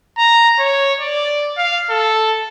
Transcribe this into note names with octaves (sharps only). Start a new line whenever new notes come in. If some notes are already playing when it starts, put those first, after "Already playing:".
A#5
C#5
D5
F5
A4